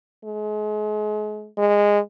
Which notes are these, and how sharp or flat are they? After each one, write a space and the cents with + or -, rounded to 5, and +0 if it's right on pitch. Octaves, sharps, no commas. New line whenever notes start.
G#3 +35
G#3 -15